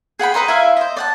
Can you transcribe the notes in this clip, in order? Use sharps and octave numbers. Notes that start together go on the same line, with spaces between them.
G#4 F#5 G5 B5
B4 D#5 A#5 C6
E4 E5 F5
C5 D#5
D5 F#5 A5